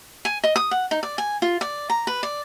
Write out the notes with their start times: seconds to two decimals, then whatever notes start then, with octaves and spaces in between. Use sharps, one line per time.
0.25 G#5
0.44 D#5
0.56 D#6
0.71 F#5
0.91 D#4
1.03 D5
1.18 G#5
1.42 F4
1.61 D5
1.90 A#5
2.07 B4
2.23 D5